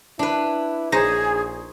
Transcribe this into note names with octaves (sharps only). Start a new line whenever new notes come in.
D4 E4 B4
A#1 D#4 G#4 C5 C#5